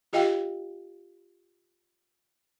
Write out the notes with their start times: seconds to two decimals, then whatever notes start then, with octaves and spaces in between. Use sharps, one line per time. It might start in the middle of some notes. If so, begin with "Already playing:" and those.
0.13 F4 G4 D#5 F5 G5